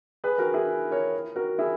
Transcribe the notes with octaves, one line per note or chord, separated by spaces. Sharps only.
G#4 B4
F#4 A#4
E4 G#4
A#4 C#5
F#4 A#4
E4 G#4